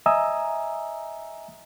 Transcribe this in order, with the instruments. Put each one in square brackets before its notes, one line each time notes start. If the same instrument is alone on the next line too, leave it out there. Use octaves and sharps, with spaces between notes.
[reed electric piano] D#5 E5 G#5 A#5 D#6 E6